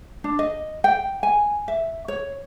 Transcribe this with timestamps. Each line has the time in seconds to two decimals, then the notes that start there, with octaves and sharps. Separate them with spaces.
0.24 D4
0.39 D#5
0.84 G5
1.23 G#5
1.68 E5
2.08 C#5